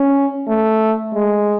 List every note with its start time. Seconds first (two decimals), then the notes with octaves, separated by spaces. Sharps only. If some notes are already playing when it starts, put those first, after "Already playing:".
Already playing: C#4
0.48 A3
1.14 G#3